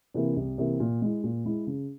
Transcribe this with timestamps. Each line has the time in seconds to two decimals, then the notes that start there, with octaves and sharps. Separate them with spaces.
0.14 C3 E3 A#3
0.36 C2
0.58 C3 E3 A#3
0.80 A#2
1.02 G#3 E4
1.24 A#2
1.45 G#3 E4
1.67 C#3